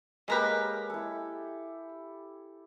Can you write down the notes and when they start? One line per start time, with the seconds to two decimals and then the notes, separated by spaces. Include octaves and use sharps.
0.28 C#3 G#3 A#3 G4 A#4 B4
0.90 E4 A4